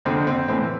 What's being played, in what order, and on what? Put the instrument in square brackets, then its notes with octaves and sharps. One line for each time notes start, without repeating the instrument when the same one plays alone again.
[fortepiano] F2 D3 C4
C4
A2 E3 C4